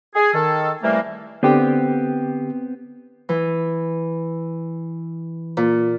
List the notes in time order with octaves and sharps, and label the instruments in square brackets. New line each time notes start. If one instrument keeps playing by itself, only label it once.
[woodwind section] G#4
D#3 A4
C3 E3 G3 A3 A#3
[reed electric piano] D3 G4 G5 [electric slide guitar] B3 C4
[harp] E3
A#2